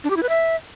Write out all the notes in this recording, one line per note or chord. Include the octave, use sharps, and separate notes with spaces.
D4
G4
E4
B4
E5